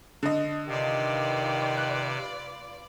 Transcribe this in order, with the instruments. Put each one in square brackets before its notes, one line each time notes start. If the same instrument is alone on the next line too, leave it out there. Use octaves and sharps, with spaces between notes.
[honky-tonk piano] D3 D#5
[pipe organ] C3 [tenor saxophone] D#3 [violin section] F4 B4 D5
[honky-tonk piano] F#6